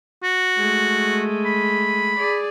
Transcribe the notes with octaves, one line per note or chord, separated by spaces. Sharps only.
F#4
G#3 A3
B5
G#4 D5